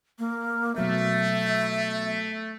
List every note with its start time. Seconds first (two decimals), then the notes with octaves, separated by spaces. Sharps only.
0.19 A#3
0.76 B2 F#3 A3 B3 E5